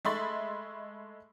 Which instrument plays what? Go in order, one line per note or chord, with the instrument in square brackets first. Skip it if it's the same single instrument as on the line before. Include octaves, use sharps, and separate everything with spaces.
[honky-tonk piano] G#3 A3 E5 B5 C6 A6